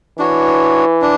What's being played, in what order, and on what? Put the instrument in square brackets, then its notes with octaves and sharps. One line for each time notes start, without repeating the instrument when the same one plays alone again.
[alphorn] E3 [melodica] D4 F#4 C#5
[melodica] D4